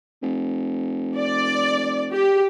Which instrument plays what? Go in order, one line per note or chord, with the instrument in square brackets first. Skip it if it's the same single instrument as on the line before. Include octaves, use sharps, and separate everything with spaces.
[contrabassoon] F1
[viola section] D5
G4